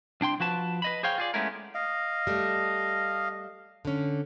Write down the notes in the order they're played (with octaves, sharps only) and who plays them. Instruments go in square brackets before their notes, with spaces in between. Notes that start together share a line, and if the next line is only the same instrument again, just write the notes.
[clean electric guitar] C2 D4 G5 C6
F3 F#4 B4 A5
B4 D#5 B5
G#4 C5 C#5 F5 G5
F4 G#4 D5
G#3 A3 B3 C#4 E4 A#4
[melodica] D#5 F5
[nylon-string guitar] G3 A3
D3 C#4